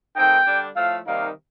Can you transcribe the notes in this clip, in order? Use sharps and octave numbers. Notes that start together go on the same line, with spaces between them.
D#3 A3 C4 D#4 G5
D3 G3 D4
A2 F3 A3 F5
C3 D#3 G3 A#3 D#4 F5